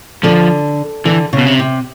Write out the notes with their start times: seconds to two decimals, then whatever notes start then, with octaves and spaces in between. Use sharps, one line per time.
0.23 D3 F3
1.05 D3 E3
1.33 C#3
1.38 B2
1.46 C3
1.59 C3